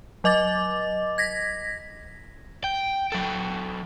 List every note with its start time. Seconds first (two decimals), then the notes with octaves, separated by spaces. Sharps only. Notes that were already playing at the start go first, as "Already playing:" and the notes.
0.24 F#3 D#5 D6 A6
1.18 G#6 A#6 B6
2.64 G5
3.12 F#3 A4